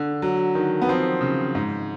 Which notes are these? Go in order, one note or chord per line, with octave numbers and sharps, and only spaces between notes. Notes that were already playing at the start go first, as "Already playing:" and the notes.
Already playing: D3
F#3
D#3
B3
F3 C4
C#3
G#2